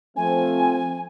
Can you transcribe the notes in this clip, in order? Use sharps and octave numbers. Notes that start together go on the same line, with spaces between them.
F3 A3 C4 G#5